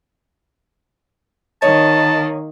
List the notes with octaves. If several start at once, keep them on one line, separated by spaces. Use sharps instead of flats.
D#3 A#3 C#5 D#5 A5